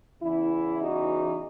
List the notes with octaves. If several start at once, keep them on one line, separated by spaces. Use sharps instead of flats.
E2 C#3 E3 E4
D#4 F#4